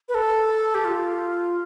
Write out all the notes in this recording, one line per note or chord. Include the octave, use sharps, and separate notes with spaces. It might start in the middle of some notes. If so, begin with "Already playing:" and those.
B4
A4
G4
F4